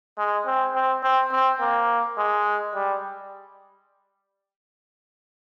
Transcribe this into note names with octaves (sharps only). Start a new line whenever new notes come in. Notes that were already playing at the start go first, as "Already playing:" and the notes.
G#3
C4
C4
C4
C4
A#3
G#3
G3